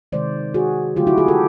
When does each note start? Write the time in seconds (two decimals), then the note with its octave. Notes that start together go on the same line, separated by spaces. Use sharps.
0.12 C3 D#3 G#3 C5 D5
0.54 F#4 G#4
0.96 D3 F#3 A3 F4 G4
1.07 E4 F#4
1.18 F#4 G#4
1.28 G4 A4